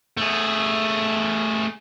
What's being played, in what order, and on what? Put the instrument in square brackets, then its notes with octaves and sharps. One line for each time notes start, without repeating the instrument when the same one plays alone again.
[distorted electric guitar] A3 G#4